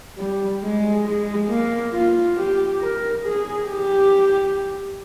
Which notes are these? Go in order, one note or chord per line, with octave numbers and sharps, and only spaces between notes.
G3
G#3
G#3
A#3
F4
G4
A#4
G#4
G4